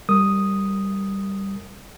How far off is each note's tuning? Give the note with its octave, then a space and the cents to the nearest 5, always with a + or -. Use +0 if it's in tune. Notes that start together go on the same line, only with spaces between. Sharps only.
G3 +0 A#4 -10 D#6 +0